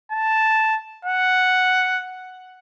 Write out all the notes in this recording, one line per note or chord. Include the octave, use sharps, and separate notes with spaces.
A5
F#5